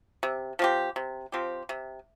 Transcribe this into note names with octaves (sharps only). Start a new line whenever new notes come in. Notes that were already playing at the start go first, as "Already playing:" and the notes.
C3
F3 C4 G4
C3
F3 C4 G4
C3